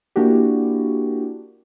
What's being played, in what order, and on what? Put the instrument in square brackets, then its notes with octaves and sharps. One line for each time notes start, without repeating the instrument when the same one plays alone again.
[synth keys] A#3 D4 E4 F#4 G4